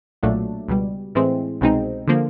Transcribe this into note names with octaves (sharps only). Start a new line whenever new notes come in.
B1 A#2 F#3 A3 D4
C#2 B2 G3
A2 E3 G#3 C4
C2 B2 G#3 C4 D#4
D3 F3 A#3